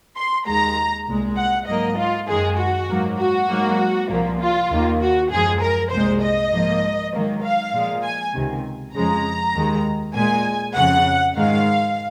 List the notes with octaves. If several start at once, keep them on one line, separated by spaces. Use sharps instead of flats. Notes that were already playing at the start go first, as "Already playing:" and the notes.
C6
D#2 D#3 G#3 A#5
C2 A#2 G#3
F#5
G#2 F#3 A#3 D#5
F4
F#2 D#3 G#3 G#4
F#4
G#2 F#3 A#3
F#4
G#2 F#3 A#3
C2 A#2 F3 A#3
F4
D#2 D#3 A#3
F#4
F#2 F3 G#3 G#4
A#4
C2 A#2 G#3 C5
D#5
G#2 F3 A#3
G#2 D#3 F#3 A#3
F5
A#2 F3 G#3
G#5
C#2 C3 D#3
F2 C#3 F3 G#3 A#5
D#2 D#3 G#3
A#2 G#3 G#5
F2 C#3 F3 F#5
G#2 D#3 G#3 F5